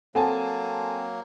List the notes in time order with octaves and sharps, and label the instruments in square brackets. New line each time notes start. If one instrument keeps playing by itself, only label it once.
[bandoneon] F#3 A#3 [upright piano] C4 G#5 A5 [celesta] A4 F#5